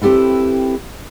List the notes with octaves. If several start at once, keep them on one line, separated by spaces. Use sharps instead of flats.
C4 E4 G4 A4 B4